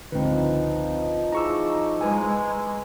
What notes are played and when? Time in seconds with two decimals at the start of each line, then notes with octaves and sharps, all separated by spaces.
0.12 C#2 G#2 D3 F3 C4 D#4 B4
1.32 E4 G#4 A#5 C#6 D6 E6
2.01 G#3 B4 G#5